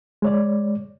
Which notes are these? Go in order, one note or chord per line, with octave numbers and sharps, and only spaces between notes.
G#3 C#5 D5